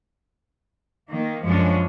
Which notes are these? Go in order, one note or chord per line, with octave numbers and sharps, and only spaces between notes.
D#3 A#3
F#2 F3 G#3 C#4 D4